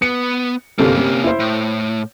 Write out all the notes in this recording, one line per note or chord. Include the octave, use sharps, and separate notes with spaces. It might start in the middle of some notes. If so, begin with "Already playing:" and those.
B3 C#7
G1 C3 A#3 C#4 A4
C3
E4 C5
A2